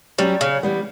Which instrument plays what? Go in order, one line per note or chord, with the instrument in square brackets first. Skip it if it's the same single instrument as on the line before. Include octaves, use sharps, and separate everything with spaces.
[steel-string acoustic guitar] F#3 C#4 G4 [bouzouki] G3
[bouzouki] C#3
[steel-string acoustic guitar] E3 G3 B3